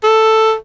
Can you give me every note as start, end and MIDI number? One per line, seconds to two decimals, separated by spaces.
0.03 0.54 69